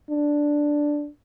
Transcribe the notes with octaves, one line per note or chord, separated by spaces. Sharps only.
D4